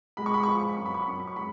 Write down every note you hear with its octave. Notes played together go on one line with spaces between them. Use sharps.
G#3 B5
C#6
B5
C#6
F3 B5
C#6
B5
F#2 C#6
B5
C#6
B5
F#2 C#6
B5
C#6
G#3 B5